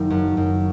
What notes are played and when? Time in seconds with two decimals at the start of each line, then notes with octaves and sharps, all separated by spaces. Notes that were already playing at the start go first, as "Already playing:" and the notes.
Already playing: F#1 D#3
0.10 F#2
0.37 F#2